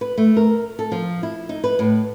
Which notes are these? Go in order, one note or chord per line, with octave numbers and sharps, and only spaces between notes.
B4
A3
A#4
A4
F3
E4
D#4
B4
A2